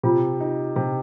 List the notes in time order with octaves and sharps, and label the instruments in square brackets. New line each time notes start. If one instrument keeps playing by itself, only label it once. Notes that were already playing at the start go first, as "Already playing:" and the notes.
[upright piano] C3 [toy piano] F4
[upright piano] D#4
C3